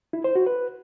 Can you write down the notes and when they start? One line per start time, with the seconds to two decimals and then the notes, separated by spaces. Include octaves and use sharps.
0.13 E4
0.24 C5
0.35 F#4
0.47 B4